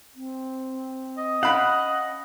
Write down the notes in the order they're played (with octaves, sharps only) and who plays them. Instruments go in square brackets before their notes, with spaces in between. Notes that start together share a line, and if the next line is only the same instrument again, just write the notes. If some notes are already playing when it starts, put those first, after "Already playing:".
[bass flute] C4
[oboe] D#5
[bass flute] C#4 [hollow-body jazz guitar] F5 B5 [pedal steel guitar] F#5